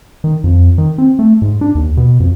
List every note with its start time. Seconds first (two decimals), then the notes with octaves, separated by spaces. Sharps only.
0.24 D#3
0.44 F2
0.78 D#3
0.98 C4
1.19 A3
1.42 G#2
1.61 D4
1.75 D#2
1.97 B2
2.20 F2